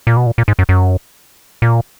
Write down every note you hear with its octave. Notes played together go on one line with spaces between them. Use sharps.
A#2
B2
A#2
A#2
G#2
F#2
F#2
A#2